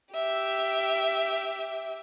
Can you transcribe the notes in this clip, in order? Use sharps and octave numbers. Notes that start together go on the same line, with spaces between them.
G4 E5